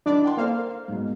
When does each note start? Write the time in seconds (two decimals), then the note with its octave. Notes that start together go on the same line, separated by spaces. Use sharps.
0.06 D#3 D4 E4 D5 D#5
0.24 F#5 G5 C6
0.37 A#3 A4 C5 F5
0.88 G#2 B2